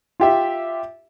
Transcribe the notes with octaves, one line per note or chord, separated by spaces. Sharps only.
F4 G4 E5